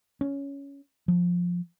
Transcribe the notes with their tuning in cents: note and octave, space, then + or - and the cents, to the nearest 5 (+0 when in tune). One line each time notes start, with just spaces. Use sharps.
C#4 +10
F3 +15